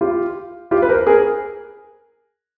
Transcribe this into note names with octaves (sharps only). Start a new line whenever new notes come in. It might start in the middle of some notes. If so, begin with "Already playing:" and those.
F4 G4
F4 G4
B4
A#4 C5
G#4 A#4